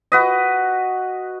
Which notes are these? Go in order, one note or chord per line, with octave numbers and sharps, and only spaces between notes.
F#4 B4 D#5